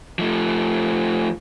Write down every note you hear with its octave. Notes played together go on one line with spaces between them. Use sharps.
F3 A3